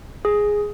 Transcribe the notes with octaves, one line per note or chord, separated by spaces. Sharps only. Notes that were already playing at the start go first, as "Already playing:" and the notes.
G#4